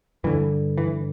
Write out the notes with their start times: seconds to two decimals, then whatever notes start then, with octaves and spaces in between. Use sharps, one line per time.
0.24 G2 D3 E3
0.78 E3